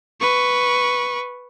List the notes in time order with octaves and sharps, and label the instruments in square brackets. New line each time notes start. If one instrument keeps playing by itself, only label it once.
[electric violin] B4 C#6